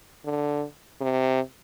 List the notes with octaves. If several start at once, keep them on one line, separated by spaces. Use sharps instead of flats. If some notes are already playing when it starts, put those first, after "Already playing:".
D3
C3